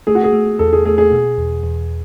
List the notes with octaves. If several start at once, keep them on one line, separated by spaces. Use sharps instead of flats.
A3 G#4
F#4
G#4
A3
E2 A4
G#4
A3 G#4
G#4
B2
E2
E2